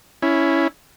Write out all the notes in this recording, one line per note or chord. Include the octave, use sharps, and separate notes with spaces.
C#4 E4